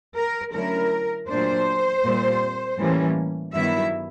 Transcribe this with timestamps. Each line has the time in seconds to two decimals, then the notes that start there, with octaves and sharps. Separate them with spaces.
0.16 A#4
0.54 D3 F#3 A3 C#4 E4 A#4
1.29 A#2 F#3 A3 D4 C5
2.04 A#2 G3 C4
2.78 A2 E3 G3 A#3 C#4
3.53 G2 D#3 F#3 B3 E4 E5